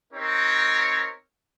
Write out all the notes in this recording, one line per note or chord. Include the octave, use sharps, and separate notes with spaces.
C4 D#4 G4 A#4 C#5